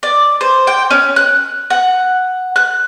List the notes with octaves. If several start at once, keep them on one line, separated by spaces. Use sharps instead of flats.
D5
C5
G5
C#4
F#6
F#5
F#6